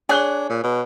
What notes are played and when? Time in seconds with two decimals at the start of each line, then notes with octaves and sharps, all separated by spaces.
0.09 D4 G#4 C#5 F#6 G7
0.49 A#2
0.63 B2